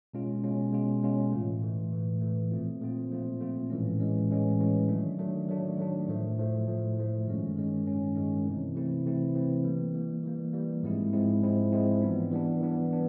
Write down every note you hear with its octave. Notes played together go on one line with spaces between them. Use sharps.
B2 G#3 C#4 F4
B2 G#3 C#4 F4
B2 G#3 C#4 F4
B2 G#3 C#4 F4
A2 E3 A3
A2 E3 A3
A2 E3 A3
A2 E3 A3
A#2 F3 A3 C4 F4
A#2 F3 A3 C4 F4
A#2 F3 A3 C4 F4
A#2 F3 A3 C4 F4
A2 E3 G#3 C#4
A2 E3 G#3 C#4
A2 E3 G#3 C#4
A2 E3 G#3 C#4
D#3 F#3 A3 D4
D#3 F#3 A3 D4
D#3 F#3 A3 D4
D#3 F#3 A3 D4
A2 F3 A3
A2 F3 A3
A2 F3 A3
A2 F3 A3
G2 D#3 G#3 C#4
G2 D#3 G#3 C#4
G2 D#3 G#3 C#4
G2 D#3 G#3 C#4
C3 E3 A3 C4 E4
C3 E3 A3 C4 E4
C3 E3 A3 C4 E4
C3 E3 A3 C4 E4
E3 G3 A#3
E3 G3 A#3
E3 G3 A#3
E3 G3 A#3
G#2 F3 G#3 C4 E4
G#2 F3 G#3 C4 E4
G#2 F3 G#3 C4 E4
G#2 F3 G#3 C4 E4
E3 G3 B3 D4
E3 G3 B3 D4
E3 G3 B3 D4
E3 G3 B3 D4